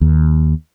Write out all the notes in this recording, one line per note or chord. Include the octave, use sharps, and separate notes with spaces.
D#2